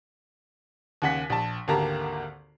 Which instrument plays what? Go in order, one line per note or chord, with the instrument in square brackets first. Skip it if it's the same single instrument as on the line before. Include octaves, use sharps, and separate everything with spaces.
[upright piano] D#2 C#3 F#5 G#5 B6
A#1 A5
G#1 D2 A#3 G4 A5 A#5